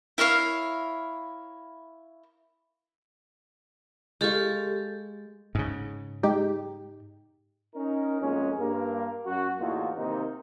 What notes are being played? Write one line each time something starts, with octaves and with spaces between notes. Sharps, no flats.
E4 A#4 C#5 F5
G#3 G4 A4 F5 C#6
G#2 C#3
G#3 D#4 G4
C#4 D#4 A#4
B1 F2 G#3 A#3 C#4
G2 A#3 A#4
F#2 F#4
E2 A2 A#3 D#4 F4 F#4
C3 D#3 A#3 D#4